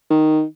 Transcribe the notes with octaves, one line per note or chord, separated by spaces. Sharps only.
D#3